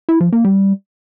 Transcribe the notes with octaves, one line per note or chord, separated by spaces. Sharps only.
E4
F3
A#3
G3